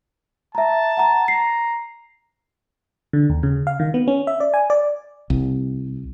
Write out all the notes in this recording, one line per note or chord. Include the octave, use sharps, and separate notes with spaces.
E5 A5 A#5
F#5 A#5
A#5 C7
D3
D#2
C#3
F5
D#3
B3
C#4
E5
D5
G#5
D5
C2